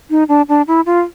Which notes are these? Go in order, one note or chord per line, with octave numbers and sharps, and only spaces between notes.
D#4
D4
D4
E4
F4